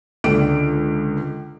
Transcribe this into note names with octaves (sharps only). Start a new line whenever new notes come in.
C#2 D3 D6 D7